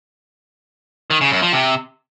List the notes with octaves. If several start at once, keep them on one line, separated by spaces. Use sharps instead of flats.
D#3
C#3
F#2
F3
C3